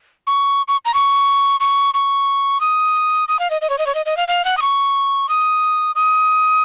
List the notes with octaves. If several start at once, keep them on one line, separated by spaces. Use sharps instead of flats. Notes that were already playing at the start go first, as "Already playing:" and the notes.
C#6
C#6
A#5
C#6
C#6
C#6
D#6
D#6
F5
D#5
D#5
C#5
D#5
C#5
D#5
D#5
F5
F5
F#5
D#6
C#6
D#6
D#6